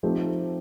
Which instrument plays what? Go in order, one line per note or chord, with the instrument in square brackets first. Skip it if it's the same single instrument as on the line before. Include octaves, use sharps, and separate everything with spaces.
[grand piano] F3 A3 C4 D#4 G4